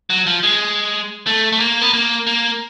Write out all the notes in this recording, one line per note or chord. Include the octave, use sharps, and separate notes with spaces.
F#3
F3
G#3
A3
A3
A#3
B3
A#3
A#3